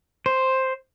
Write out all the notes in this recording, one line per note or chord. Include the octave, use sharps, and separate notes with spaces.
C5